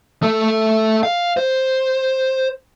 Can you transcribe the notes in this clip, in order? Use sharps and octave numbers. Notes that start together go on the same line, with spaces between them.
A3 A4
F5
C5